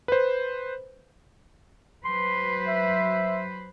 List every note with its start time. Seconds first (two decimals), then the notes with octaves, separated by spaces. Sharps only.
0.08 B4 C5
2.05 F#3 B4 C5 C6
2.67 E5